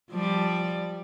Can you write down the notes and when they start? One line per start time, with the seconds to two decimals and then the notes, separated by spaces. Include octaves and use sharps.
0.11 F3 G3 D5